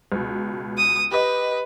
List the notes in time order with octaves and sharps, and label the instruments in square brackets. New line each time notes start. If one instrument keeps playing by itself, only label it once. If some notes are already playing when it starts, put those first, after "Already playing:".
[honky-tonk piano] C#2 B2
[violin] D#6
[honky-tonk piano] G4 D#5 [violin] B4